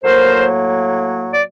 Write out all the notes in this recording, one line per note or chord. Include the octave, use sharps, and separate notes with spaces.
A2 F#3 A#3 A#4 C5
D5